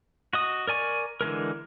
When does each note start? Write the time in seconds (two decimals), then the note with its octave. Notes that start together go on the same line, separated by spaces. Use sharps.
0.33 F#4 D#5 D#6
0.67 A#4 D5 G#5 C#6
1.21 D3 E3 G#3 A#4